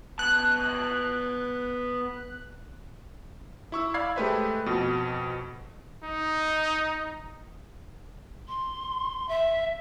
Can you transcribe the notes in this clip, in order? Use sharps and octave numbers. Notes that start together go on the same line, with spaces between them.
B3 A5 F#6
E4 C#6 E6
D5 F5 B5 G#6 C7
G#3 A3 G4 B4 C5 E5
F2 B2
D#4
C6
E5